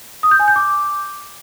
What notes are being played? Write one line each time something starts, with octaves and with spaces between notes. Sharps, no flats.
D#6
G6
G#5
G6
D6